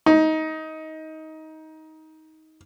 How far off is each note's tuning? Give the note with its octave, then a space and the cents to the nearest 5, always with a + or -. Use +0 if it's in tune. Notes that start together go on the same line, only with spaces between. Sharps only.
D#4 +20